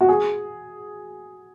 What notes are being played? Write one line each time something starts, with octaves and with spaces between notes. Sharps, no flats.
F#4
G#4